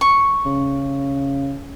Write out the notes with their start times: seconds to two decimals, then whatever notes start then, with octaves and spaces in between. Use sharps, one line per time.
0.01 C#6
0.46 C#3